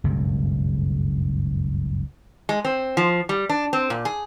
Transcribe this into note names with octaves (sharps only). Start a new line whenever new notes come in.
F#1 C#2 G2 B2
G#3
C4
F3
G3
D4
C4
A#2
G#4